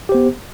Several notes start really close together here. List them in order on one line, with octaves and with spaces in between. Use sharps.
G4 C5 B3